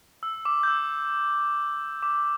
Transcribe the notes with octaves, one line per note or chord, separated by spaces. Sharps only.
E6
D6
G6
E6
D6